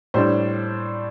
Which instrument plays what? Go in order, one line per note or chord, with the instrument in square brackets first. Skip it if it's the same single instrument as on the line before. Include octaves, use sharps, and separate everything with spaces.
[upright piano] A2 G3 D4 C5